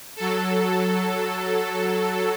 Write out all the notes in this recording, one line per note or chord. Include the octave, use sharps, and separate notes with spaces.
F#3 A4